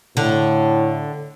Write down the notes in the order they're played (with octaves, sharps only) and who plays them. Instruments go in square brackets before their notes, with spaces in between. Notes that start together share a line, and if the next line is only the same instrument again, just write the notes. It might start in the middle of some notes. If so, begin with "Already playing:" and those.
[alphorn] A2 [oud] D3